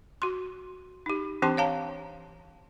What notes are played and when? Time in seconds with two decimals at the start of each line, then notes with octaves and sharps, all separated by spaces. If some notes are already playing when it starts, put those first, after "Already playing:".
0.22 F#4 C6
1.06 D#4 G4
1.42 E3 C4 D4 G4 A5 C6
1.57 C#5 F5 A5 A#5